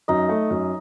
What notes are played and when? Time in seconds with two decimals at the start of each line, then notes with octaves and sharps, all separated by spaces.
0.08 F#2 D#4 D#5
0.29 A3
0.50 F#2